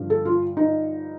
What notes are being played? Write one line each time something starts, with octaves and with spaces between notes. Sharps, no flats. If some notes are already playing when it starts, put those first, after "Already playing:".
Already playing: G2 D3 F3
A4
F4
D#4